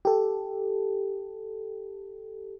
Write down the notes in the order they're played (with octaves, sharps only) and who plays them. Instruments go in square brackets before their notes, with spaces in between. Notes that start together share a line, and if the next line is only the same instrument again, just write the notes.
[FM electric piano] G4 A4